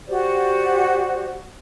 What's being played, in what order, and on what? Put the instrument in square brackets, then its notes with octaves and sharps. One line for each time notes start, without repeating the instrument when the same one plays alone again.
[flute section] F#4 G4 C5 D5